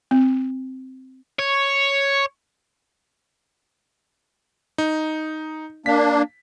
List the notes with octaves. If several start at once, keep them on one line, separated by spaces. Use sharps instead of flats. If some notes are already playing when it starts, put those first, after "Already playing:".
C4
C#5
D#4
A#3 D4 B6